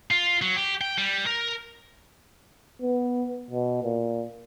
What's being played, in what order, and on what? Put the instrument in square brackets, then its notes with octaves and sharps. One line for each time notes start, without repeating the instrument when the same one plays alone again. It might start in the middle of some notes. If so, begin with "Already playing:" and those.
[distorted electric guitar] F4
F#3
G4
G5
G3
A#4
[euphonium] B3
B2
A#2